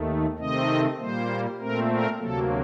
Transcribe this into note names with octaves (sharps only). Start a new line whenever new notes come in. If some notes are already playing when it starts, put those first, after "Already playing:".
Already playing: D#2 D#3 A3
C3 D#3 A3 C4 D#5
A#2 G3 A#3 C5
A#2 A3 C4 A#4
A#4
D2 C3 F#3 A#3 A4